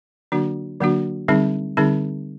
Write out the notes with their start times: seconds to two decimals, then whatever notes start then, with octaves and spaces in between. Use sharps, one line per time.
0.32 D3 F#3 A#3 D4 F#4
0.80 D3 F#3 A#3 D4 F#4
1.28 D3 G3 C4 D#4 G#4
1.77 D3 G3 C4 D#4 G#4